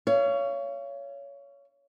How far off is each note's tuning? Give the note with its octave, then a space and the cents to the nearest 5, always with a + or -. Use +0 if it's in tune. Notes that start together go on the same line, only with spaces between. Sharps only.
C#5 +20 F5 -35